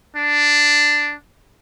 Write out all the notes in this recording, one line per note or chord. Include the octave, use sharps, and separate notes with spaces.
D4